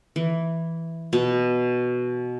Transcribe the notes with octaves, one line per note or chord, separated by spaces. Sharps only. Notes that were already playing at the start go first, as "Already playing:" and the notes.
E3
B2